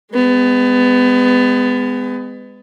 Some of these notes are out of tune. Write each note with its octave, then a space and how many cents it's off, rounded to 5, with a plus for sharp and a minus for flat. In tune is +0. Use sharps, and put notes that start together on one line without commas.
G#3 -20 B3 +25